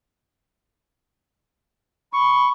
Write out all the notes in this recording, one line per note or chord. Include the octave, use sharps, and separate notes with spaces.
B5 C#6